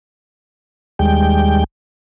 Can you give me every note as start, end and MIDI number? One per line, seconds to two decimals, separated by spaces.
0.99 1.64 39
0.99 1.64 55
0.99 1.64 56
0.99 1.64 79